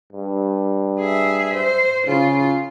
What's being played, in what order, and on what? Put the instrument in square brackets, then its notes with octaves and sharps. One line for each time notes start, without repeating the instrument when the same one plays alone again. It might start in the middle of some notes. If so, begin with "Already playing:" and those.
[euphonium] G2
[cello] G#4 E5
C5
[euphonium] C#3 [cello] F4